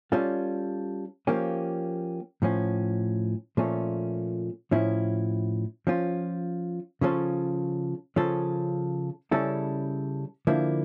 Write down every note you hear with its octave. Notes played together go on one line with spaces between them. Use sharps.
G3 C#4 F4 A4
F3 A#3 C#4 G4
A2 F3 C#4
A#2 F3 A3 C#4
A2 F3 C#4 E4
F3 C#4 F4
C#3 F3 C#4 F4 A4
C#3 F3 C#4 F4 A4
C#3 G3 C#4 E4 A4
D3 F3 A#3 E4